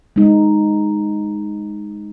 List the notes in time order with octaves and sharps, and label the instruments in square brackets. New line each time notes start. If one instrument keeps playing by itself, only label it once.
[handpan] G#3 D#4